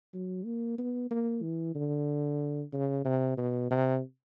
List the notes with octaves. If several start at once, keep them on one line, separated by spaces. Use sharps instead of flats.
F#3
A#3
B3
A#3
E3
D3
C#3
C3
B2
C3